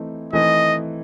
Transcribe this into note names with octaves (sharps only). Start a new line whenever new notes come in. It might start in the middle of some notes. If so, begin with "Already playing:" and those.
Already playing: E3 A3 C4 D#4
E3 A3 C4 D#4 D#5